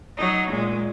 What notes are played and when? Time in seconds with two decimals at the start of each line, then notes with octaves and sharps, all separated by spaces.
0.17 F#3 D#4
0.51 A#2 G#3